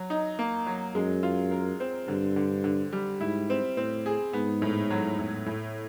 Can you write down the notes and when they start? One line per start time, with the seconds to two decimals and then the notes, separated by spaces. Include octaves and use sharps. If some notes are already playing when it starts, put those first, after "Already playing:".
Already playing: F#3
0.10 D#4
0.39 A#3
0.66 F#3
0.95 F#2 G#3
1.23 F4
1.51 A#4
1.80 C4
2.08 G2 D3
2.36 D3
2.64 D3
2.93 G3
3.20 G#2 E4
3.50 C4
3.77 A2 C4
4.06 G#4
4.33 G#2 B3
4.62 A2
4.90 F#3
5.19 A2
5.46 A2